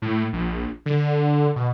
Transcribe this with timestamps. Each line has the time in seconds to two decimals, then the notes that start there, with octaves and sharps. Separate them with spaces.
0.02 A2
0.33 A#1
0.86 D3
1.56 B2